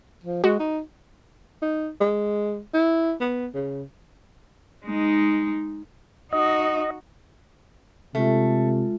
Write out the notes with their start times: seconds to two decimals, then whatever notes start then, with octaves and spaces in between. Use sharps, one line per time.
0.24 F3
0.44 G#3 F#4
0.59 D#4
1.62 D#4
2.01 G#3
2.74 E4
3.20 B3
3.54 C#3
4.86 G#3 D#4
6.33 D#4 F#4 D#5
8.15 C3 G#3 A3 F4